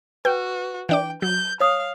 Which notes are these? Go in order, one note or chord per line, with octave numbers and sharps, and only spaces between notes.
F#4 B4 G5
E3 D4 G5 D6
F#3 G6
C#5 F5 D#6